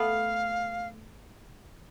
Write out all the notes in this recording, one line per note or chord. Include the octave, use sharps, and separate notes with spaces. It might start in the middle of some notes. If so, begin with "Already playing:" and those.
Already playing: A3 B3 F5